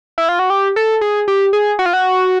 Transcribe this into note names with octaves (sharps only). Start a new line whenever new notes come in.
E4
F4
F#4
G4
A4
G#4
G4
G#4
F#4
F4
F#4